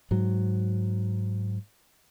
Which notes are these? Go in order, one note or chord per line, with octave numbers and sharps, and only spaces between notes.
G#2 F#3